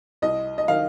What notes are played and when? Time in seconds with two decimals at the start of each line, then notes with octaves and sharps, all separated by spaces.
0.22 C2 D#5
0.58 D#5
0.68 D#3 F5